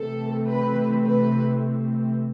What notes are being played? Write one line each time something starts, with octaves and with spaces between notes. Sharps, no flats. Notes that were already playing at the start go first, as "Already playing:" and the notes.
Already playing: C3 E3 A3 C4 A4
B4
B4